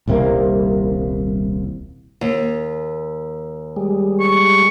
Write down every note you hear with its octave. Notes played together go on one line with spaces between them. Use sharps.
D#1 C2 C3 A#3
D#2
G3 G#3
C#6